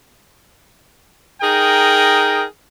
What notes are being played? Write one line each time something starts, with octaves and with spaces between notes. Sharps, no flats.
D#4 G#4 A#4 G5